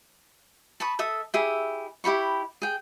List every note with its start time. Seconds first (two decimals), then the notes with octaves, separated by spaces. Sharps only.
0.80 A5 B5 C#6 D#6
0.99 A4 E5 D#6
1.34 E4 G4 G#4 E5
2.04 E4 G4 B5 C#6
2.62 G#4 G5